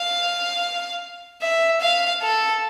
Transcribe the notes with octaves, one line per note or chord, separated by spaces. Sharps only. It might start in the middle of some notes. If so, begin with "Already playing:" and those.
Already playing: F5
E5
F5
A4